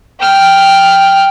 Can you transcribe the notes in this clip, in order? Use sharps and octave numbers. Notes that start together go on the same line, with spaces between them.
G5 F6